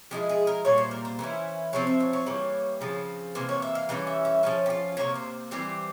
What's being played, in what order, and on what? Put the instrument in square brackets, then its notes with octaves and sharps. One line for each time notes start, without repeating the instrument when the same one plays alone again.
[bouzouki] F3 G#3 E4 G4
G#4
A#4
A#2 G3 A#3 C#5
C5
A#4
C5
E3 A#3 C#4 E4
C3 F3 C4 C#5
E5
C#5
C#5
E3 G3 A#3
C#3 F3 C4
C3 E3 A#3 C5
C#5
E5
F5
E3 G3 C#4 F5
E5
E5
F3 G#3 C#4 C#5
G4
F4
C3 G3 A#3 C#5
C5
E3 G3 C4 G4